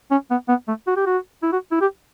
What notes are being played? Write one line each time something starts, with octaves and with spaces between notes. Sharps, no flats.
C#4
B3
B3
A3
F#4
G4
F#4
E4
F#4
E4
G4